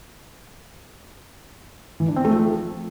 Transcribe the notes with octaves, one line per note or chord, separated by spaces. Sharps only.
E3
D4
C4
A3
F3